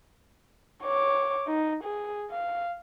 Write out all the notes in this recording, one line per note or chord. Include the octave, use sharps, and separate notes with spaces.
C#5 D6
D#4
G#4
F5